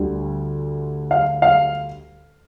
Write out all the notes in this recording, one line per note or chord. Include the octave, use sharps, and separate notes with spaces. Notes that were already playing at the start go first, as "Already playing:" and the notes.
Already playing: D2 D3 G3
F5
F5